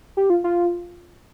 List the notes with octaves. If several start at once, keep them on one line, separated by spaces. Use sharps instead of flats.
G4
F4
F4